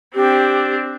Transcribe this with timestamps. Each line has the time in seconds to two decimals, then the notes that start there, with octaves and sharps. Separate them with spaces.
0.15 C4 D4 G4